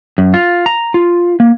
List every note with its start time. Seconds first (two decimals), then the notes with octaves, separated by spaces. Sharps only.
0.18 F#2
0.34 F4
0.66 A#5
0.94 F4
1.40 A#3